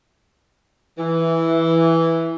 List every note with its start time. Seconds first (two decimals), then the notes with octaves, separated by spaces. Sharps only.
0.98 E3